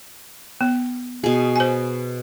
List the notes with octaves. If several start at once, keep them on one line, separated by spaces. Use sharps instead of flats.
B3
B2 G#4
C5 G#5